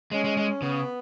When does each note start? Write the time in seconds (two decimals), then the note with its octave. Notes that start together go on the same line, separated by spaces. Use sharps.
0.11 G#3 C#4
0.24 G#3
0.37 G#3
0.62 C#3 B3